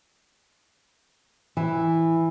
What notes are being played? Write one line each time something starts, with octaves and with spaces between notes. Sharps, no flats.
E3